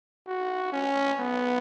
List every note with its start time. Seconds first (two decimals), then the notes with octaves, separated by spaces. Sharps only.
0.27 F#4
0.72 C#4
1.19 B3